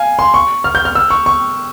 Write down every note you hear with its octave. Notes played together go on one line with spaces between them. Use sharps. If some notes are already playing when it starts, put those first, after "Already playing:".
Already playing: F5 G#5
C6
C#6
F6
G6
F6
E6
C#6
C#6